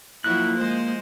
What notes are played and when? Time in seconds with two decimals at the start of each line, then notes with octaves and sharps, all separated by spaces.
0.24 F3 F#3 A#3 E4 F#6
0.57 G#3 C5